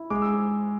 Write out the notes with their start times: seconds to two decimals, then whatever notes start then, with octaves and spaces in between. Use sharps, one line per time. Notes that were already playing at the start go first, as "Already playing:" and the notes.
Already playing: E4
0.10 G#3 D6
0.22 E6